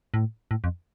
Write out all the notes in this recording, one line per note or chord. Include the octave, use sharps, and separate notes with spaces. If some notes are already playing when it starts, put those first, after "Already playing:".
A2
A2
F2